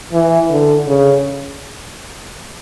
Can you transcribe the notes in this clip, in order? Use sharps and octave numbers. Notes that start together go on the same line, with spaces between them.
E3
D3
C#3